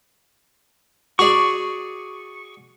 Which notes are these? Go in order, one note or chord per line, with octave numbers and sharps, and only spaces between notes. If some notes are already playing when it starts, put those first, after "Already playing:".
F#4 G#4 D5 C#6